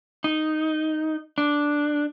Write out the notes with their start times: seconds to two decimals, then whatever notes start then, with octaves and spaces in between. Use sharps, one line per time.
0.24 D#4
1.38 D4